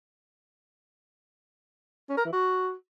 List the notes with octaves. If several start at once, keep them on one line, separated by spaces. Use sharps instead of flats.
C#4
A#4
E3
F#4